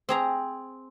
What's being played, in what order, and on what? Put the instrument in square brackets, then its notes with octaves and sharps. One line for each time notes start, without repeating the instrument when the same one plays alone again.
[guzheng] C4 G#4 A#5